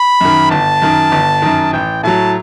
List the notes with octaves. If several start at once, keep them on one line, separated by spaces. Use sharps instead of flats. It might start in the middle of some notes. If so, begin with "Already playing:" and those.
Already playing: B5
F#2 D#3
G1 A5
F#2 D#3
G1
F#2 D#3
A1 G5
A2 F#3 A5